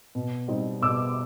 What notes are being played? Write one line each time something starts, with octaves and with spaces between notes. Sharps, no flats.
B2
G3 C4 D#4
B2 D6 E6